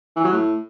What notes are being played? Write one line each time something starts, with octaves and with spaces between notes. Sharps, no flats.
E3
F#3
A2